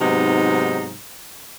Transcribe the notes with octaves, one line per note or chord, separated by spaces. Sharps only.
G#2 C3 F#3 B3 D#4